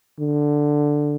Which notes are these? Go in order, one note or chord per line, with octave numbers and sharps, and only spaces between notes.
D3